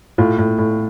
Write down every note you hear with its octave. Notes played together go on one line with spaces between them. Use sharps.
A2 F4
A2
A2